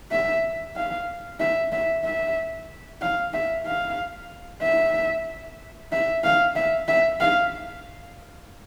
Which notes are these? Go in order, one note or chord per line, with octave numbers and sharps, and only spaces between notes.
E5
F5
E5
E5
E5
F5
E5
F5
E5
E5
F5
E5
E5
F5